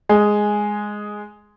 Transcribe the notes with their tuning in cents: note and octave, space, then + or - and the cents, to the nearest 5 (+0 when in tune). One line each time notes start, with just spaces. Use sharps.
G#3 +0 G#4 +0